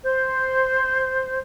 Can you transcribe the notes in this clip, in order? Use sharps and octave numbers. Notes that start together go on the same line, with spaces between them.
C5